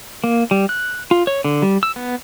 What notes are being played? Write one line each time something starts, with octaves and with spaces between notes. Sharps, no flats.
A#3
G3
F#6
F4
C#5
D3
G3
E6
B3